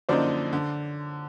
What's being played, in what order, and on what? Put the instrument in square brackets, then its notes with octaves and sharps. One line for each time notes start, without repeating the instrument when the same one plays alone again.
[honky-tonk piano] F#2 D3 F3 A#3 D#4 [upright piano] C5 D5
[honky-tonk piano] D3